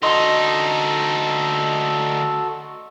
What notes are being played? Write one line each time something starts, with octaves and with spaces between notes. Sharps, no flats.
D2 D#4 F#4 A4 D#5 C6 E6